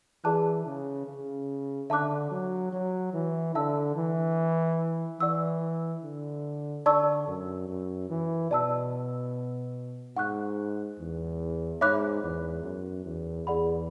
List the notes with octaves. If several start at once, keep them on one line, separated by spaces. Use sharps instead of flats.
E3 G#4 D5 A5 D6 F#6
C#3
C#3
D3 E5 A5 D6 F#6
F#3
F#3
E3
D3 E5 A5 E6
E3
E3 B4 D5 F#5 C#6 E6
D3
D3 D5 A5 C#6 E6
F#2
F#2
E3
B2 D5 A5 E6
G#2 F#5 C#6 F#6
E2
G#2 C#5 E5 B5 D6 F#6
E2
F#2
E2
E2 G#4 D5 F#5 B5